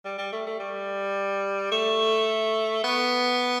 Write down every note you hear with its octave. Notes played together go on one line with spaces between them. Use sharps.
G3
G3
A3
A3
G3
A3
B3